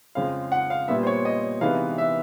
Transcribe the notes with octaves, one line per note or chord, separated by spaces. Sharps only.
F2 C#3 F3 G#3 F5
F#5
F5
A#2 G3 B3 E5
C5
C#5
D#5
C3 E3 G#3 B3 D#4 F5
E5